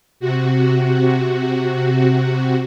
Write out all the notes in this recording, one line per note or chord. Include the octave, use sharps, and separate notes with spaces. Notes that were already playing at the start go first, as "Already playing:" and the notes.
C3 F#4